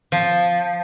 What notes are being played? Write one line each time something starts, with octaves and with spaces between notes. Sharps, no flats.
F3